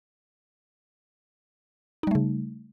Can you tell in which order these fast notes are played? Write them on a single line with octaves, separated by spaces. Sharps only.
D#4 G3 A3 C#3